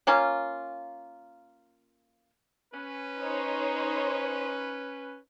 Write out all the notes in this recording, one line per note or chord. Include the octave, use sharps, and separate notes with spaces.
A#3 C#4 F4
C#4 B4
D#4 C5 C#5